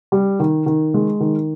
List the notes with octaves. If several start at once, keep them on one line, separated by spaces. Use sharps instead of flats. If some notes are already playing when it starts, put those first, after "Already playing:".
G3
D#3
D#3
G#3
D#3